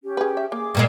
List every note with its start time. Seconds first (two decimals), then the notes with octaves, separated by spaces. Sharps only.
0.04 C#4 G4
0.17 G#4 B4
0.37 E5
0.52 A#3 G#4 D6
0.75 G2 A#2 G#3